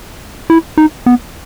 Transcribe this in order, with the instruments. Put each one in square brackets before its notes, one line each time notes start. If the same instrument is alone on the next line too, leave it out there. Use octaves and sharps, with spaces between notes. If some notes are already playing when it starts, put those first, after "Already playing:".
[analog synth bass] E4
D#4
B3